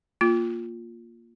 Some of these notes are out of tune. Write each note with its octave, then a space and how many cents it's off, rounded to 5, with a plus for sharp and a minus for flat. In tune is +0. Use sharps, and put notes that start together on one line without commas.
A#3 +0 F4 +0